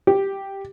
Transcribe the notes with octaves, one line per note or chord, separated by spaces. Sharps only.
G4